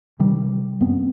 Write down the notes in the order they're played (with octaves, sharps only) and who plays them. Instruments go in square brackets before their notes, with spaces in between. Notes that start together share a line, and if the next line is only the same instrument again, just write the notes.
[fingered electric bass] C3 D#3 G3
F#2 B3 C4